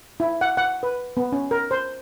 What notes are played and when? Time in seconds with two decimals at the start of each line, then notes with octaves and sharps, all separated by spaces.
0.20 E4
0.41 F#5
0.57 F#5
0.83 B4
1.17 B3
1.32 C#4
1.51 A#4
1.71 C5